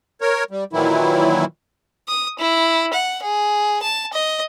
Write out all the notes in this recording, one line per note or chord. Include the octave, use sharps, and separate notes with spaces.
A#4 C#5
G3
A#2 D#3 E3 F#3 E4
D#6
E4
F#5
G#4
A5
D#5